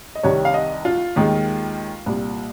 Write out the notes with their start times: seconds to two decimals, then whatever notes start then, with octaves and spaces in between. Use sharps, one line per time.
0.15 D#5
0.23 C2 C3 D#3 G3 C#5
0.45 F5
0.54 D#5
0.85 F4
1.16 D#2 D#3 G#3
2.06 C2 A#2 G3